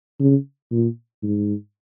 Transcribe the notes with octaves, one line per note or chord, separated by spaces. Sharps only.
C#3
A#2
G#2